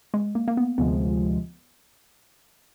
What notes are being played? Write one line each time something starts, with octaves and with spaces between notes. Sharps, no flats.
G#3
A#3
A#3
B3
D2 C3 F3 G#3 B3